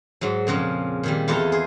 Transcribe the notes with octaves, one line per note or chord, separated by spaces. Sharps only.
G#2 F#3
F2 A#2 C#3 F3
A#2 D#3 G3
E2 E4 F4 A4 D#5 A#5
G#4 C5